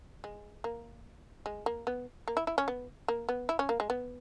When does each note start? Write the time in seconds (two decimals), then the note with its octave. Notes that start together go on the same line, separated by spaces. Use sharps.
0.24 G#3
0.64 A#3
1.46 G#3
1.66 A#3
1.87 B3
2.28 A#3
2.37 E4
2.47 E4
2.58 C#4
2.68 B3
3.08 A#3
3.29 B3
3.49 E4
3.59 C#4
3.69 A#3
3.80 G#3
3.90 B3